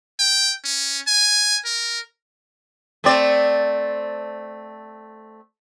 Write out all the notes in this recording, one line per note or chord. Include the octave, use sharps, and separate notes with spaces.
G5
C#4
G#5
A#4
A3 C4 D5